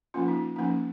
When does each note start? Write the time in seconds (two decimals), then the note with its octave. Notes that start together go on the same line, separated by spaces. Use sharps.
0.14 F3 A#3 C#4 F4
0.28 D#4
0.56 F3 A#3 C#4 D#4